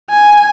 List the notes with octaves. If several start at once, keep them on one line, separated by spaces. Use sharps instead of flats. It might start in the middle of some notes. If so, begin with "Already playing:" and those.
G#5